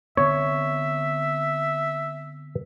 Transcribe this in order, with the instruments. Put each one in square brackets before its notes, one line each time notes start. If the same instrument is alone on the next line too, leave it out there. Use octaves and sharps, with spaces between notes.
[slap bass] D3 B3 C4 [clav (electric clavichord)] C#5 [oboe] E5